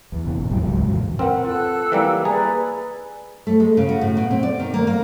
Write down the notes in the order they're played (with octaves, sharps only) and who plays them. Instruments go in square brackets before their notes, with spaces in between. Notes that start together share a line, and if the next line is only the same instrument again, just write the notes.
[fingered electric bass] E2
B2 E3
G#1 A#2
D#2 G#2 F3 G3
E1 C#2 G#2 F#3
F#2 A#2 C#3 E3
[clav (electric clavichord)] C4 [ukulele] A#4 B4 F#5
[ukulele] F4 [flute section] A4 E6 F#6
[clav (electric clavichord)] E3 G3 A#3
[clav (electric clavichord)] G#4 [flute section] B4 D5 [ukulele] A#5
[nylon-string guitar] A3
G#3
C#3
F#4
A2
B2
C4
D5
D#3
A#3
A#3